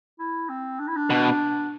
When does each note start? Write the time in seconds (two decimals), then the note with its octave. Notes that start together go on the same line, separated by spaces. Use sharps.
0.19 E4
0.49 C4
0.80 D4
0.87 E4
0.96 D4
1.10 B2